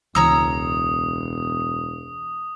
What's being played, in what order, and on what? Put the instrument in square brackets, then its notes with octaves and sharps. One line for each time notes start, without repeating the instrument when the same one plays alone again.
[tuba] E1 [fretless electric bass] C#2 C#3 E3 [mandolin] C#5 A#5 E6 [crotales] D#6